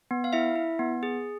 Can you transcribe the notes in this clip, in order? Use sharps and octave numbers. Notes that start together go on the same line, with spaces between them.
B3
F5
E4 E5
E4
B3
G#4